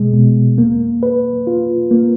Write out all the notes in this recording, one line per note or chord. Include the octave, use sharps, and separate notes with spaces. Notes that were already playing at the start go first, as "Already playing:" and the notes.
Already playing: B2 G#3
B2
A#3
B4
F4
A#3